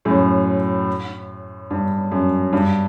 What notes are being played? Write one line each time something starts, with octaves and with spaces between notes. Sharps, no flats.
F#2 A2
G2
F#2
G2